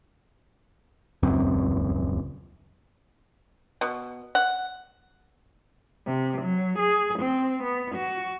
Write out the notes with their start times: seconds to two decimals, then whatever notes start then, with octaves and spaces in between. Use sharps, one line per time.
1.23 D#1 C#2 F#2 C4
3.81 B2
4.35 F#5
6.05 C3
6.42 F#3
6.77 G#4
7.18 C4
7.62 B3
7.95 F#4